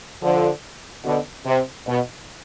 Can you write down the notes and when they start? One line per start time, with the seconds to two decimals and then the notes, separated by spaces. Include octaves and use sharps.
0.23 D3 F3
1.05 B2 D3
1.46 C3
1.87 B2